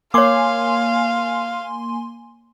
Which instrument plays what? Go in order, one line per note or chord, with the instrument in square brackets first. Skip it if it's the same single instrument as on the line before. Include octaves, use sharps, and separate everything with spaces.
[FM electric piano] A#3 G#5 C6 [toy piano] C#5 D6 [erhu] F5